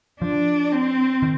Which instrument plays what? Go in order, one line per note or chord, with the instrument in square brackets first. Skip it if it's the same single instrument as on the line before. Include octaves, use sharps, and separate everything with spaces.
[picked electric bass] F3 [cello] D4
[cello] C4
[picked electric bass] D#3